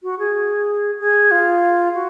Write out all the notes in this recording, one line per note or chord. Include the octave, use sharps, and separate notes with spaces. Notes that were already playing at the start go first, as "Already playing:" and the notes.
F#4
G#4
G#4
F4
F#4